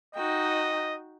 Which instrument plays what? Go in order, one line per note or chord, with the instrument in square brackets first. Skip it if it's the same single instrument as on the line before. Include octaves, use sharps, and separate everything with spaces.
[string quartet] D#4 F#4 G5 [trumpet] D#5